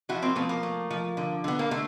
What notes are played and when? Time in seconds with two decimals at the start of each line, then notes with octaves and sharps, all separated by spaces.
0.09 F3 E4 F#4
0.22 A#3 C4
0.36 F3 A3 B3
0.49 A#3
0.63 A3
0.91 F3
1.17 D3
1.44 D3 B3
1.59 A#3
1.71 D3 A3